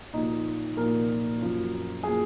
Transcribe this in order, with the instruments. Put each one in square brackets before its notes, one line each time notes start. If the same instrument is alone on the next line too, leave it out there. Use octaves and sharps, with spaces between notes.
[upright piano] A#2 F3 A#3 D#4
A#2 F3 A#3 A#4
F#2 F3 A#3
F3 A#3 G#4